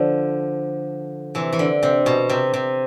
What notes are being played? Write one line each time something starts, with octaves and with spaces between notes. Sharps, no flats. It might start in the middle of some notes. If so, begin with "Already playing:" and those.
Already playing: D3 F3
C3 E3
E3
D3
C3
B2
C3
C3